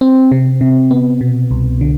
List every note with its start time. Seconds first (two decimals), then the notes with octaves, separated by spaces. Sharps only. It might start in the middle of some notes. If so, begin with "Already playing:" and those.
0.01 C4
0.32 C3
0.61 C3
0.91 B3
1.21 B2
1.51 C2
1.81 D3